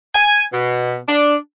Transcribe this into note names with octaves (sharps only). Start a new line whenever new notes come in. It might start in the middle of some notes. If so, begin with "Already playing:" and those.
G#5
B2
D4